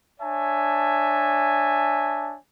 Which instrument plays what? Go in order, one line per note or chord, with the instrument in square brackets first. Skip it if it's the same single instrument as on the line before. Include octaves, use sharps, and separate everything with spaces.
[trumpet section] D4 C#5 E5 G#5 A5